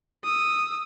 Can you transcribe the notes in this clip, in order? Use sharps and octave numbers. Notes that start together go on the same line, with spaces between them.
D#6 E6